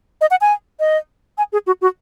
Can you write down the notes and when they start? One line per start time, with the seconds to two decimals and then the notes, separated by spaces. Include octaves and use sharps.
0.21 D#5
0.31 F#5
0.41 G#5
0.80 D#5
1.38 G#5
1.53 G#4
1.67 F#4
1.81 F#4